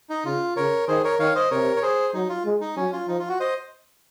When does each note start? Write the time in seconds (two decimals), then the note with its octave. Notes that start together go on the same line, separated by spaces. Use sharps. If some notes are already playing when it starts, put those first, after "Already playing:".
0.10 D#4
0.25 C#3 F4
0.56 C#3 A#4 C#5
0.88 D#3 G#4 C5
1.04 A#4 C#5
1.19 D#3 C#5 F5
1.35 C5 D#5
1.51 C3 A#4 C#5
1.76 C#5
1.82 G#4 C5
2.14 F#3 D#4
2.29 F4
2.45 G#3
2.61 D#4
2.76 F#3 C#4
2.93 F4
3.08 F3 D#4
3.19 F4
3.29 F#4
3.40 C5 D#5